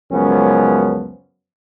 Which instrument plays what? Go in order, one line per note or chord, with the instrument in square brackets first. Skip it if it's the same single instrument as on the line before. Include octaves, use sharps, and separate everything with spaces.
[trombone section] C#2 F#2 F3 B3 C#4